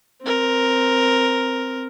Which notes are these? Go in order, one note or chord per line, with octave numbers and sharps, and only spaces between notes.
C4 A#4